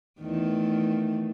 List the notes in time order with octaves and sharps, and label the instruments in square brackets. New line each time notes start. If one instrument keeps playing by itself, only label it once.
[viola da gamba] E2 D#3 A3